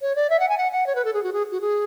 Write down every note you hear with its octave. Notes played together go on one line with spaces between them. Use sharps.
C#5
D5
E5
F#5
G#5
F#5
F#5
C#5
B4
A4
G#4
F#4
G#4
F#4
G#4